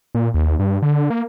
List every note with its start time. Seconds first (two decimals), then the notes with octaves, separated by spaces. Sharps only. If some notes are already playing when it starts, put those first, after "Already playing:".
0.15 A#2
0.34 D#2
0.59 G2
0.82 D3
1.10 A#3